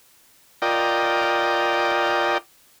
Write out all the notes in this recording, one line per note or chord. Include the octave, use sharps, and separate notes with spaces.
F4 A#4 D5 D#5 G5